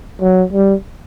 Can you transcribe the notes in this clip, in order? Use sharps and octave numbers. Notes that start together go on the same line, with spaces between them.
F#3
G3